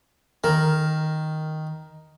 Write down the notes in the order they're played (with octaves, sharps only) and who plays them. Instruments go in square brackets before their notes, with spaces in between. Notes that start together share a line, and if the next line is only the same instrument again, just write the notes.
[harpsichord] D#3 [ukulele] A#4